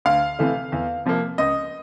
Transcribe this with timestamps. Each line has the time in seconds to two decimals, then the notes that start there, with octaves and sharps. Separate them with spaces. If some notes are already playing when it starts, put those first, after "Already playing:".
0.05 D2 F5
0.39 C3 E3 A3
0.72 E2
1.05 C3 F3 A#3
1.38 C#2 D#5